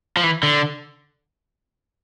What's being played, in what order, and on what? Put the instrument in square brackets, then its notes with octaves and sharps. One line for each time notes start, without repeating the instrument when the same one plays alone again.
[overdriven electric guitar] F3
E3
D3